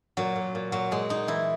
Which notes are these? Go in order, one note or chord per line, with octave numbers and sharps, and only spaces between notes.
A#2 F#3
A#2
A#2
A#2 F#3
A#2 G#3
A#2 D#4
E3 E4